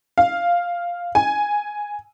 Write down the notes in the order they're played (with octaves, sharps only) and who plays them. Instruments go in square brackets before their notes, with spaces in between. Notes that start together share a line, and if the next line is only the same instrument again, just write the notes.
[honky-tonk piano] F5
G#5